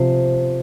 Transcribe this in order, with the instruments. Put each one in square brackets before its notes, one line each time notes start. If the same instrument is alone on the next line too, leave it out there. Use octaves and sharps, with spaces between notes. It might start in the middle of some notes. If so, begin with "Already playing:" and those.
Already playing: [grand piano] C3 F3 [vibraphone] C5